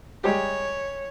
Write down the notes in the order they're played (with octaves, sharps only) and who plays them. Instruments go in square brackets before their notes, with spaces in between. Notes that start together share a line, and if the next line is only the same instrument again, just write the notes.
[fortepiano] G3 G#3 G4 [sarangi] C#5